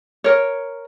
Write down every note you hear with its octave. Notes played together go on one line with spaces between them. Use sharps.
A#4 C#5